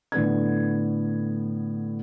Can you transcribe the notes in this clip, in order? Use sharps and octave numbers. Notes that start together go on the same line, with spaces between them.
A2 D3 B3 G#6